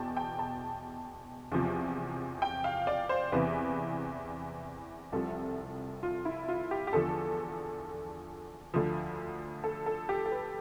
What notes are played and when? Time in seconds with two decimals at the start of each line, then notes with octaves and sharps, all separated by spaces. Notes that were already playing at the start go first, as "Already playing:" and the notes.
Already playing: E2 B2 G5 A5
0.17 G5
0.39 A5
1.52 E2 C3 F3
2.42 G5
2.64 F5
2.87 D5
3.09 C5
3.32 E2 C3 E3 B4
5.12 C2 C3 F3 A4
6.03 F4
6.25 E4
6.48 F4
6.71 G4
6.87 G4
6.93 E2 D3 F3 A4
8.74 D2 D3 F3
9.64 A4
9.86 A4
10.09 G4
10.26 A4
10.31 B4